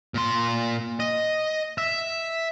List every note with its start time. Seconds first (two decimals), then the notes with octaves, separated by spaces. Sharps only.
0.14 A#2 C6
1.00 D#5
1.78 E5